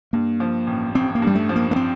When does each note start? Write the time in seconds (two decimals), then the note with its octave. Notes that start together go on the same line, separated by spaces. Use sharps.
0.13 G2 A#3
0.40 F3
0.67 A1
0.95 A1 C4
1.15 A#3
1.22 G2 G3
1.35 A3
1.49 F3
1.56 A#3
1.71 A#3
1.76 C4